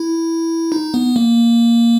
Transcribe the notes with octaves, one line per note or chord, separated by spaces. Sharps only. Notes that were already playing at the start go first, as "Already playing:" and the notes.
Already playing: E4
D#4
B3
A#3